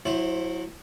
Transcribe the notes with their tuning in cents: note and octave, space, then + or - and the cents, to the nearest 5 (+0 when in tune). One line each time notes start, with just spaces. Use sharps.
F#3 -25 E4 +0 C5 +5